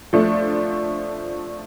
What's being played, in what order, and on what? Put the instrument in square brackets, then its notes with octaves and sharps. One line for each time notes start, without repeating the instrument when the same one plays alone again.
[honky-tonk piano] F3 A3 D4